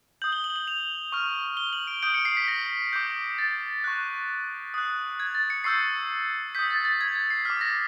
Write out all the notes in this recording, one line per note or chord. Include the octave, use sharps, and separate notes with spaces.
D#6 G6 F#7
G7
F#7
G7
F#7
F7
C#6 F6
G7
F#7
D7
D#6 G6 D7
C#7
C7
B6
A#6
D6 G6
A6
C#6 F#6
D#6 F#6
G#6
A6
C#7
C#6 E6 G6 C7
D#6 G6 B6
A6
A6
G#6
G#6
C7
D6 F6 B6
A#6